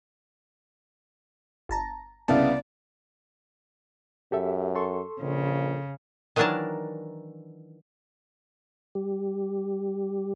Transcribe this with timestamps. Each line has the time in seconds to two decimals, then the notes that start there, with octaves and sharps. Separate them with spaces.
1.69 G1 A5 A#5
2.28 C2 C#3 B3 D5 E5 F5 A5
4.32 F#2 G4 A4 E5
4.75 A4 C6 C#6
5.22 A#1 C#3
6.36 D#3 E3 F#3 D4 A#4 A5
8.95 G3 G4